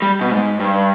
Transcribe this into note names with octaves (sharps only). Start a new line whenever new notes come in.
G3
B2
G#2
G2